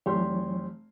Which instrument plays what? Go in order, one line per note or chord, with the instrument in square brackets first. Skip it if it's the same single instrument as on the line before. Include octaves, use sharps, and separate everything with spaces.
[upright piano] F1 G4 C6 [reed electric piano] E3 F#3 C#5